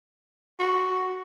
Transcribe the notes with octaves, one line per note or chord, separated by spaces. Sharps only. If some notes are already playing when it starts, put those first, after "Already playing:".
F#4